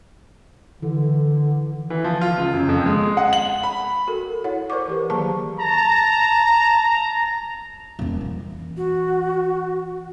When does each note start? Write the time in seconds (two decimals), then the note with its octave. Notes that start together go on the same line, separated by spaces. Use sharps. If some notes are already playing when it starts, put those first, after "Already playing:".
0.82 D3 E3
1.90 E3
2.04 F3
2.21 F4
2.37 C#2
2.54 F#2
2.69 F2
2.86 G#3
3.17 F#5
3.33 F#7
3.63 B5
4.07 F#4 A4 A#4
4.44 E4 C#5 F#5
4.70 A#4 C5 D5 C#6 D6
4.87 E3 G4 B4
5.10 D#3 F#3 A#3 G#4 A5 C#6
5.59 A5 A#5
7.99 D#1 F2
8.21 E3
8.77 F#4